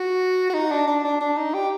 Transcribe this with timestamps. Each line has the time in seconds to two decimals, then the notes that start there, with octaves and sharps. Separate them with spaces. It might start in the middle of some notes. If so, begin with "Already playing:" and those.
Already playing: F#4
0.50 F#4
0.54 D#4
0.71 D4
0.87 D4
1.04 D4
1.21 D4
1.37 D#4
1.54 G4